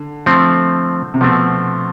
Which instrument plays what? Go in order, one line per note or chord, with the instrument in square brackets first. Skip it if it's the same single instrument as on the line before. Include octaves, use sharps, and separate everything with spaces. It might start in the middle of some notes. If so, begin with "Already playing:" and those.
Already playing: [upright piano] D3
[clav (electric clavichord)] F3 A3 C4
[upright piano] C3
[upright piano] B2 [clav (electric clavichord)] F3 A3 C4